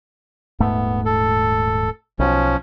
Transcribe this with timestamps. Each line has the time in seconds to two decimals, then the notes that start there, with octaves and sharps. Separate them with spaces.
0.60 D#1 G#2 A3 B3
1.06 A4
2.19 B1 F3 C#4